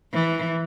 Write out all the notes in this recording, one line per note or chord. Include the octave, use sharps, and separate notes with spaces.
E3